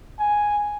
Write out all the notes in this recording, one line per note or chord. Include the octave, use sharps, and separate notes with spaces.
G#5